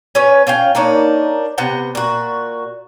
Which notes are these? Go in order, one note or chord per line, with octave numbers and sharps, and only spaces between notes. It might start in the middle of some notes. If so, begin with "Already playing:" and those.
C#4 B4 C#5
C#4 F4 F5 G5
A#3 D4 D#4 C#5
C3 B3 F#5 G5
A#2 F#4